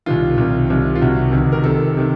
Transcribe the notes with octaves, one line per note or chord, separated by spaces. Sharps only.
C2 C3 D#3 F4
C2 C3 D#3
C2 C3 D#3
F4
C2 C3 D#3 F#4
C#2 C3 D#3
A#4
C#2 C3 D#3 A4
C3 D#3